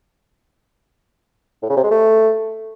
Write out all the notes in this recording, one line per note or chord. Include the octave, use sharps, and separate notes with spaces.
A2
C#3
C3
G#3
A3